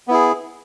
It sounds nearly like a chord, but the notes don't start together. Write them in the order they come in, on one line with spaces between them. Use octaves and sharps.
B3 E4 G#4